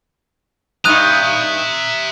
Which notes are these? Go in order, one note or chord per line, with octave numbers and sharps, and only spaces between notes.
G2 D#4 E5 A#5 D#6 F#6 D#7